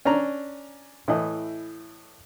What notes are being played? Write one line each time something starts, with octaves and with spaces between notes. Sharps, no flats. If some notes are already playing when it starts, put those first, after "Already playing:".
C#4 D4 A#5
A2 E3 D#5